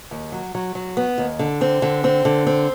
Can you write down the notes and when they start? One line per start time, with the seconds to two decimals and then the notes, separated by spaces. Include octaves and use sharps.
0.11 D#2
0.32 F#3
0.55 F#3
0.75 F#3
0.97 B3
1.18 D#2
1.39 D3
1.61 C4
1.82 D3
2.04 C4
2.25 D3
2.47 C4